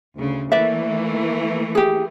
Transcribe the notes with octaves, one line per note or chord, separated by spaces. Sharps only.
D2 C#3
E3 A3 A#3 B4 D5 E5
G4 G#4